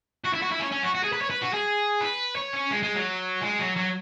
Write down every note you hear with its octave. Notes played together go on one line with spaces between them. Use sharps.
F#4
E4
F#4
E4
C#4
C#4
F#4
F#4
G#4
B4
C#5
B4
F#4
G#4
B4
C#5
C#4
G#3
G#3
F#3
G#3
F#3
F#3